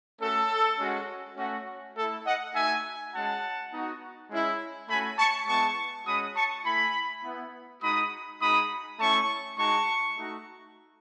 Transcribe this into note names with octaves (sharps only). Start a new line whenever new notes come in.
A3 C#4 F#4 A4
G#3 C#4 F#4
A3 C#4 F#4
A3 E4 A4
D#5 F#5
A3 D#4 F#4 E5 G#5
G#3 C#4 F#4 F#5 A5
B3 D#4 F#4
G#3 C#4 E4
A3 C#4 F#4 G#5 B5
A5 C#6
G#3 B3 E4 A5 C#6
G#3 C#4 F#4 B5 D#6
A5 C#6
A3 E4 G#5 B5
B3 E4
G#3 D#4 F#4 B5 D#6
G#3 D#4 F#4 B5 D#6
A3 C#4 E4 A5 C#6
G#3 D#4 F#4 A5 C#6
A3 D#4 F#4